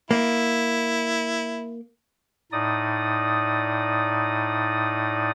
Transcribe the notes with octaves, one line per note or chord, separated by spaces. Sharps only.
A#3 E4
A2 D#4 D5 D#6